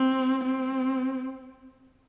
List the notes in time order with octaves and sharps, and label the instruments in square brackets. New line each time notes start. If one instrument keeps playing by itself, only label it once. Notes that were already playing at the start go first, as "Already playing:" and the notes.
Already playing: [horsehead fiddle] C4
C4